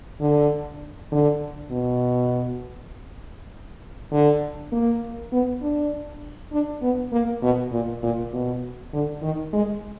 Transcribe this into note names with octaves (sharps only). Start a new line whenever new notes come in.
D3
D3
B2
D3
A#3
B3
D4
D4
B3
A#3
B2
A#2
A#2
B2
D3
D#3
G#3